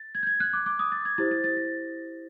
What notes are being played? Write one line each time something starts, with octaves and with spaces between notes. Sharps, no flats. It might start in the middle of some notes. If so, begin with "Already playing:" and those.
Already playing: A6
G#6
G6
G#6
F#6
D6
D6
D#6
A6
G#6
E4 G4 C5 A6
A6
A6
A#6